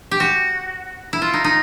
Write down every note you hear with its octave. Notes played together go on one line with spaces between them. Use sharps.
G4
F#4
E4
F4
D#4
D#4